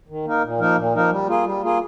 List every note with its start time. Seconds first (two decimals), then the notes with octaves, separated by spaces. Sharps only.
0.08 D#3
0.25 A#3 D#4 A#4
0.43 A#2
0.59 F3 A#3 D#4 A#4
0.76 A#2
0.94 F3 A#3 D#4 A#4
1.10 G3
1.27 A#3 F4 G#4
1.45 G3
1.62 A#3 F4 G#4